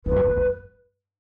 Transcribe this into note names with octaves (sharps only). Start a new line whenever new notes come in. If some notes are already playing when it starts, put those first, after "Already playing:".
E3 B4
G#2
F#2
F#2
F#2